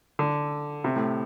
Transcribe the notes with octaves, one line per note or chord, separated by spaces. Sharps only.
D3
C3
A2